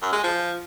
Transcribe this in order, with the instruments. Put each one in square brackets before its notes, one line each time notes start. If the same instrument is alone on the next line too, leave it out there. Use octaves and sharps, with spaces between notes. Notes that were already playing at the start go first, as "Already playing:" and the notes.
[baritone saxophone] F#2
G#3
F3